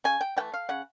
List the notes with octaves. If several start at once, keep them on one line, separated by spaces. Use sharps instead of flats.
C#3 G#5
G5
E3 A3 G5
F5
C#3 F#5